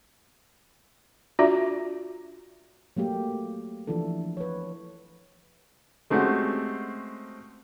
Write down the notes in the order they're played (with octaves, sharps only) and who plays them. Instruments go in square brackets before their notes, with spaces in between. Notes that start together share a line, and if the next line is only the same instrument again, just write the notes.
[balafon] D4 F4 F#4 D5 E5
[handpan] F#3 A3 A#3 G4
E3 F3 D4 E4 A4
B4 C#5
[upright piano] G#3 A3 C4 C#4 F#4 G4